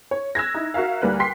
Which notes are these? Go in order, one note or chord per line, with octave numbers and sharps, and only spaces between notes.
C#5
E6 F#6 G#6 A#6
D#4 E4
F#4 A#4 E5 F5
D2 G3 A#3 B4 F#6
G5 C6 B6 C7